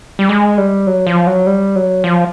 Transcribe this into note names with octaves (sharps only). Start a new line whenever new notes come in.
G3
G#3
G3
F#3
F3
F#3
G3
F#3
F3